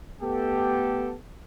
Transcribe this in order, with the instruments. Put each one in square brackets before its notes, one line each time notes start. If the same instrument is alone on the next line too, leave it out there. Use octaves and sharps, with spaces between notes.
[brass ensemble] A3 B3 G4 A4